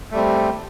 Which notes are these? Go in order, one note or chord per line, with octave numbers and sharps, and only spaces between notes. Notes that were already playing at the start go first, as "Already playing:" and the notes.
G3 A3 C4